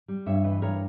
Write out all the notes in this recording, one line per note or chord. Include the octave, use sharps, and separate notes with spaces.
G3
G2 C#5 E5
E3 B4 D#5
G2 A#4 C#5